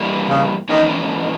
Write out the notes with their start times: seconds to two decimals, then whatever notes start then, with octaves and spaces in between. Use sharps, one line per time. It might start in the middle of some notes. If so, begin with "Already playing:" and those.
Already playing: G2 E3 G3 A#3 E4
0.28 C#3
0.69 G#2 D#3 E3 A#3 C#4 E4